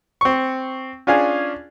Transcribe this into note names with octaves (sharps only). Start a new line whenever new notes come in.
C4 C#6
C#4 D4 F4 G#4 G#5